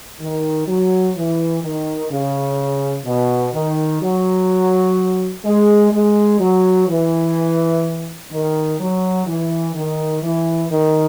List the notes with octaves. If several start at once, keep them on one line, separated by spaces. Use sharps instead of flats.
D#3
F#3
E3
D#3
C#3
B2
D#3
F#3
G#3
G#3
F#3
E3
D#3
F#3
E3
D#3
E3
D#3